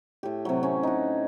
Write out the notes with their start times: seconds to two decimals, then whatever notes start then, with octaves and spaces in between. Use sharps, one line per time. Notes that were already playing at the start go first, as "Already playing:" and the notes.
0.23 A2 G4
0.45 C3 F#3
0.63 C#4
0.83 D#4 F#4